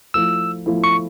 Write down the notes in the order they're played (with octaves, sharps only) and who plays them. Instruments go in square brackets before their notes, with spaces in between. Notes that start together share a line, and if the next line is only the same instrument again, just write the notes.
[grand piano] F3 A3 E4 [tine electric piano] E6
[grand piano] F3 A3 E4
[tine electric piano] C#6